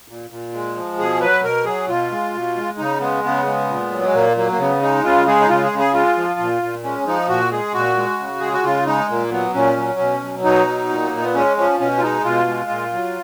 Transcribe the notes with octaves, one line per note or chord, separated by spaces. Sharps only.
A#2
A#2
G#3
F3
B2 G#4
F#3 B4
B2 A#4
F#3 G#4
B2 F4
G#3
B2
G#3
C#3 D#4
G#3 B3
C#3 B3
G#3
A#2
F#3
G#3
A#2 A#3
F#3 A#3
A#3
C#3 B3
G#3 D#4
C#3 F4
G#3 G#4
D#4
C#3 F4
G#4
C#3
G#4
G#3 F4
F3
A#2
A#2
G#3 C#4
F3 D#4
A#2 F#4
G#3 G#4
A#2 F#4
G#3
C#3
G#3 G#4
F#4
C#3 F4
G#3 D#4
A#2 A#3
F#3 B3
A#2 C#4
F#3
B2
F#3
B2 D#4
F#3
A#2
A#2 A#3
B3
G#3 C#4
F3 C#4
B2 C#4
F4
G#3 D#4
B2 F4
G#3
A#2
F#3